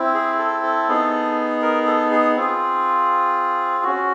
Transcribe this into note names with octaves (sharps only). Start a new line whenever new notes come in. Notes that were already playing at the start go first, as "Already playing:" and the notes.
Already playing: C4 E4
G#4
A4
A4
B3 D#4 G#4
A#4
A4
G#4
C4 F4 G#4
C#4 F#4